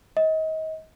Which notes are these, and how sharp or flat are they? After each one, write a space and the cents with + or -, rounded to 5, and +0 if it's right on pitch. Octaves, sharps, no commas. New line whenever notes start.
D#5 +30